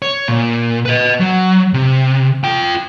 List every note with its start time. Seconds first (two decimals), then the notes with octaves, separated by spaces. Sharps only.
0.02 C#5
0.28 A#2
0.86 B4 D#5
1.20 F#3
1.73 C3
2.44 F4 G5